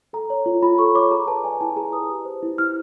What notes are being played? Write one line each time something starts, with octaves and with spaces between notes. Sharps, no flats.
A4 A#5
C#5
F4
F4 B5
A4 C#6
C#5 D6
G#4 A#5
B4 A5
D5 G#5
E4 A5
G#4 A#5
B4 D#6
G4
C5
E4
E4 F6